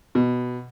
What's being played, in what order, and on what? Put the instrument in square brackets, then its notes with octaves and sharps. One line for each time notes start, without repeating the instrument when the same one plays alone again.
[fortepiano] B2